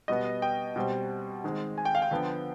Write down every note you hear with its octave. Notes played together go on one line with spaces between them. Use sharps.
B2 G3 B3 D#5
G5
B2 G3 C4
D#3 G#3 C4
G#5
G5
F5
G5
D3 F3 B3